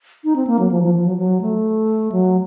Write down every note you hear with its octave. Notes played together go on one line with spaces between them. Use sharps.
D#4
C4
A#3
F#3
F3
F3
F3
F#3
F#3
A3
F#3